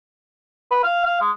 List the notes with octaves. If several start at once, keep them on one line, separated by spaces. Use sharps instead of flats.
B4
F5
F5
G#3